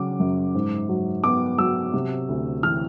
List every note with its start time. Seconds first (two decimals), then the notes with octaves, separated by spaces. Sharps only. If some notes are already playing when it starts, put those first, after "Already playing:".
Already playing: C#3 F#3 D6
0.20 F#2
0.55 G#2
0.89 F#3
1.24 B3 D6
1.58 F#3 E6
1.94 C3
2.29 D2
2.63 E3 F6